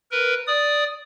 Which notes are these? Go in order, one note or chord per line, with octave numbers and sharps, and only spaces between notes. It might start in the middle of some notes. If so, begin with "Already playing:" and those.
A#4 B4
D5 D#6